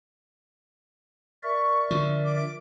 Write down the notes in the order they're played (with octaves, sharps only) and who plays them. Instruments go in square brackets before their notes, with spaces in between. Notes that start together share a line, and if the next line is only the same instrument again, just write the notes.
[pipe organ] A#4 D5 E5 [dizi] C#6
[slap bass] D3 F3
[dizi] D6